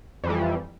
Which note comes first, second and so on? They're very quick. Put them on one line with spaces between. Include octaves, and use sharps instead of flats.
F2 E3 G3